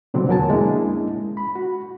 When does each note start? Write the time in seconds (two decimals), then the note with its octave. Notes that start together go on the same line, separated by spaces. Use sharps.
0.14 B2 D3 F#3 G3 A#3 C4
0.28 E2 F#3 B3 A#4 G#5 A5
0.50 G#3 A#3 C#4 D4 E4
1.37 B5
1.55 F#4